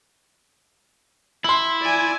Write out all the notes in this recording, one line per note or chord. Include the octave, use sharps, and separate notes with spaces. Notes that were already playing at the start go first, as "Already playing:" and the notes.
E4 C6 F#7
D5 G#5